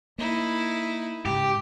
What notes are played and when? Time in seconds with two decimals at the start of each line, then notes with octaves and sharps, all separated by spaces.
0.18 A#3 D#4 E4
1.25 G#2 C#3 G4